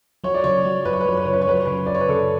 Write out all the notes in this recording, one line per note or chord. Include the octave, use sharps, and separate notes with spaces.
F#3 C#5
D5
C#3 C#5
F#3
F#2 B4
C#5
B4
F#3 C#5
B4
C#3 C#5
B4
C#5
F#3 B4
C#5
C#3 B4
F#2 D5
C#5
B4
C#3 A4